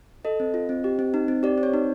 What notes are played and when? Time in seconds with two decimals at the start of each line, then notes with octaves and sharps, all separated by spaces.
0.25 A4 D#5
0.40 C4
0.54 F4
0.69 C4
0.84 G4
0.99 C4
1.14 D#4
1.28 C4
1.43 G4 D5
1.58 C4
1.63 C#5
1.74 D#4